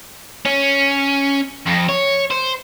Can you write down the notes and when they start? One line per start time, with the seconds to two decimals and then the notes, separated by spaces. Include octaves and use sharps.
0.45 C#4
1.66 F2
1.89 C#5
2.31 C5